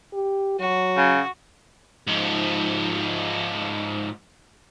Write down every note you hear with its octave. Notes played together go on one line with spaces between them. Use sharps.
G4
F#3 F#4
C#3
G#2 F3